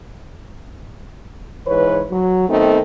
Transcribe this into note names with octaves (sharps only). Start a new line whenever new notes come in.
G#2 E3 B4 C#5
F#3
D#3 A3 B3 C4 D#4